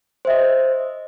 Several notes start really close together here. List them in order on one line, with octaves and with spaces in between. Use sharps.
C5 E5 D#5